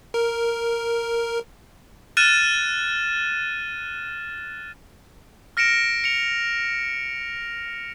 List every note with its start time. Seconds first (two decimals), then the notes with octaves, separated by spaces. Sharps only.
0.14 A#4
2.17 F6 F#6 A6 D#7 E7
5.57 F6 A#6 C#7 D7 E7
6.04 C#7 F7